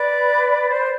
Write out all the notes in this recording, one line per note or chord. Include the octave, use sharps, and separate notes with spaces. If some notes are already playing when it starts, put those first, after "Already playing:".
Already playing: B4 D5
C5